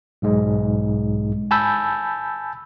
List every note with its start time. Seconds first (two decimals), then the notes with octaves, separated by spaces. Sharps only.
0.22 B1 G#2 G#3
1.51 G#5 A5 B5 E6 G6